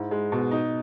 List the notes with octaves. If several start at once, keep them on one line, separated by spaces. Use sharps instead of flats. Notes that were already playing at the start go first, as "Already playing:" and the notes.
Already playing: G#2 E4
G#3
B2
D#4